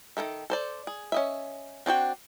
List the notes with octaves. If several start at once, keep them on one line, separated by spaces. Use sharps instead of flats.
D#3 E3 A4 E5
A4 C5 D5
G#4
C#4 D#5 E5
C4 D4 F#4 G5